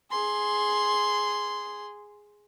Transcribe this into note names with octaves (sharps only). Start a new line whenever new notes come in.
G#4 C6